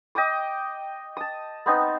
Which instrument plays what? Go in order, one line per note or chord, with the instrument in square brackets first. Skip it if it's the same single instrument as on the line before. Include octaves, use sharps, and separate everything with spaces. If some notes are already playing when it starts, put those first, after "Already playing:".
[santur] D#5 G5 D6 D#6
A5 D#6
B3 C4 D#4